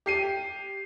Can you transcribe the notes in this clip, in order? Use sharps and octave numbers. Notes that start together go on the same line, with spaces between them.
G4 C7 D#7